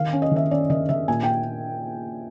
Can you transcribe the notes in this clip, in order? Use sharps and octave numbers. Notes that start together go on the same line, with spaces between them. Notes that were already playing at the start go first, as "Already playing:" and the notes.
Already playing: D#3 F5
C#4
D#5
D#3 E5
C#4 D5
D#3 D#5
D#3 E5
A#2 G#5
G5